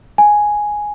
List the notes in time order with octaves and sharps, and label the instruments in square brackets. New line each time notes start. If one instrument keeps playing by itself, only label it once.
[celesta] G#5